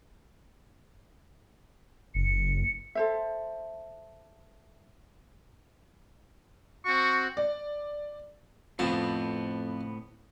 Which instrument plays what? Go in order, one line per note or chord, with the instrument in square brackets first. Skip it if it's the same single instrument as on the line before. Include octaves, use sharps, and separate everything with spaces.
[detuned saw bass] F#1 [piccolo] C#7
[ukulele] A4 C5 E5
[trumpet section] C4 F#4 [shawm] C#6
[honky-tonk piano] D5
[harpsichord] F2 A5 [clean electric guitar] A2 B3 C4